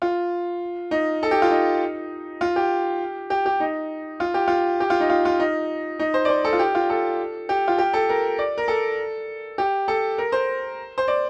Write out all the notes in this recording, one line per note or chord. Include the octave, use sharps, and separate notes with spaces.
F4
D#4
A4
G4
F4
D#4
F4
G4
G4
G4
D#4
F4
G4
F4
G4
F4
D#4
F4
F4
D#4
D#4
C5
D5
C5
A4
F4
G4
F4
A4
G4
F4
G4
A4
A#4
D5
A#4
A4
G4
A4
A#4
C5
C5
D5